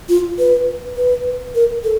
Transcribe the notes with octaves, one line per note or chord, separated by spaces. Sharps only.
F4
B4
B4
A#4
A4